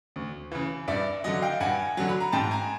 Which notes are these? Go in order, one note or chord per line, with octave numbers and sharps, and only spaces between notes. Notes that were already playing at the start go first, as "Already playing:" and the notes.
D2
C#3 E3
G2 D5 E5
D3 F#3 D#5
F5 G5
G2 F#5 G#5
D3 F#3
B5
A#5
G#2 G5 A5
G#5 A#5